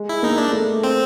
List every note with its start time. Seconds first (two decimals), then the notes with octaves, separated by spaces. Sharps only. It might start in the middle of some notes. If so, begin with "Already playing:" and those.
Already playing: G#3
0.09 E4
0.23 A#3 D#4
0.38 D4
0.53 A3
0.84 C4